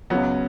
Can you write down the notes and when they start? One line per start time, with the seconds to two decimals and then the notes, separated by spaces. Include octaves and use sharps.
0.10 C#2 C#3 F#3 B3